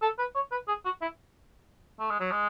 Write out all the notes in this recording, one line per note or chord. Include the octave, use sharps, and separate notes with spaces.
A4
B4
C#5
B4
G#4
F#4
E4
A3
G#3
F#3
G#3